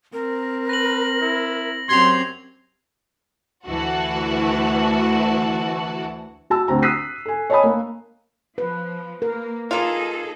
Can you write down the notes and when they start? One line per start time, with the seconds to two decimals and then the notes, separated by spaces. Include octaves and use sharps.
0.13 C4 A#4
0.69 B4 A#6 F#7
1.22 E4
1.89 F#2 C4 G4 C6 G#6 C7 F7
3.66 D2 E3 F#4 A5
6.50 F#4 A5 E6
6.68 D2 C4 A#5
6.82 D#6 E6 F#6 B6 C7 D#7
7.26 A4 G#5
7.50 C#5 D#5 G#5 A5 B5 D#6
7.63 A#3
8.58 F3 B4
9.22 A#3 A#4
9.71 A#3 D#4 F4 G#4 A4